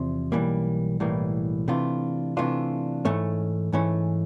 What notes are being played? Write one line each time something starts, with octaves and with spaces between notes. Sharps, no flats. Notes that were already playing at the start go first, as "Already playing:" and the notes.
Already playing: E2 C3 F3
B1 A2 E3 G3 A#3
B1 A2 E3 G3 A#3
C3 E3 A3 D4 F4
C3 E3 A3 D4 F4
G#2 E3 A3 C#4
G#2 E3 A3 C#4